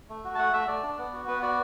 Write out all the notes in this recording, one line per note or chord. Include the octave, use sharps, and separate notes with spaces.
A3
F#4
A5
A3 F#5
A3 E5
A3 D5
D4
B3
F#4
B3 B4
F#4 D5